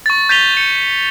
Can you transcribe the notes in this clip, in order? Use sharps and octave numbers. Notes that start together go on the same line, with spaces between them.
C#6 A6
G6 A6 B6 D#7 F7 G7
G6 C#7